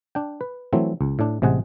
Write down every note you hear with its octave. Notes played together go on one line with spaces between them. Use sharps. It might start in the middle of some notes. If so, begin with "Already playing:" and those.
D4 G5
B4
E3 F#3 A3 C4
C#2
A2 D4
A1 C3 G#3 G#4 F#5